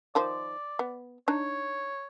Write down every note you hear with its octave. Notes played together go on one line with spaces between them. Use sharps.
D#3 F3 C5 D5
B3
D4 D#4 C#5